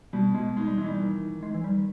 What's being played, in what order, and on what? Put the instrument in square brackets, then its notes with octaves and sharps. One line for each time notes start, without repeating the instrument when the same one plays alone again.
[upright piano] B2 [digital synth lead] G3
[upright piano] B2 [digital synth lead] G#3
[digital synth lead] G#3 [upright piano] D#4
[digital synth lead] G3
[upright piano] E3 [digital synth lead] G#3
[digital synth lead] G3
[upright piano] D#3
D#3
[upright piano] D#3 [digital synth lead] G#3
[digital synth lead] E3
[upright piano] D#3 [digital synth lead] G3